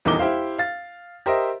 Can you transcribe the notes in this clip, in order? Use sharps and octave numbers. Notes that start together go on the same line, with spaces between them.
D#1 E2 D#4 A#4 D6 G7
E4 G4 C5 F5
F5 A6
G4 A#4 C5 D#5 E5